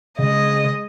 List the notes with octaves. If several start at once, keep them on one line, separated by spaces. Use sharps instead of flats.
C#3 G#3 D#5